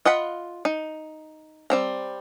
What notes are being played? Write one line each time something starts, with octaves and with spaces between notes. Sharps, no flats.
F4 D#5 F#5 B5
D#4
G3 C4 A#5